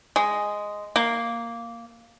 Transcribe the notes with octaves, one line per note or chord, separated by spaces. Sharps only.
G#3
A#3